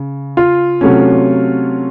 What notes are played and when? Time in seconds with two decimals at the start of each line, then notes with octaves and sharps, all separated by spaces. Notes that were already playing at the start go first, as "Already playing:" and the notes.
Already playing: C#3
0.37 F4
0.81 C3 F#3 A3 C#4